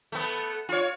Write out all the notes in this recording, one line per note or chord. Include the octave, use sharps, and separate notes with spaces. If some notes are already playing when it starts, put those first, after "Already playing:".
A3 B3
F4 C#5